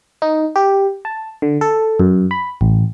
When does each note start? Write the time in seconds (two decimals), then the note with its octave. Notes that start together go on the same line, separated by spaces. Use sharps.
0.22 D#4
0.56 G4
1.05 A5
1.42 D3
1.61 A4
2.00 F#2
2.31 B5
2.61 A1